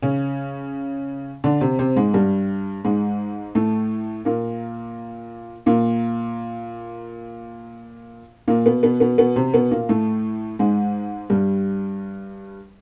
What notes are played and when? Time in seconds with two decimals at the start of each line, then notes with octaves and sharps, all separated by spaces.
0.03 C#3 C#4
1.44 D3 D4
1.61 C3 C4
1.79 C3 C4
1.96 G#2 G#3
2.14 G2 G3
2.85 G#2 G#3
3.55 A2 A3
4.25 A#2 A#3
5.66 A#2 A#3
8.48 A#2 A#3
8.66 B2 B3
8.83 B2 B3
9.00 B2 B3
9.18 B2 B3
9.36 C3 C4
9.54 B2 B3
9.71 A#2 A#3
9.89 A2 A3
10.59 G#2 G#3
11.30 G2 G3